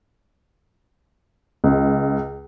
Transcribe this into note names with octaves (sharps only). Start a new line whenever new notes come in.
C#2